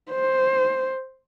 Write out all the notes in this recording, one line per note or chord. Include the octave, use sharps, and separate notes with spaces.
C5